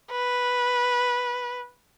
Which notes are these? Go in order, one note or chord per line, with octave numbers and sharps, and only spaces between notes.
B4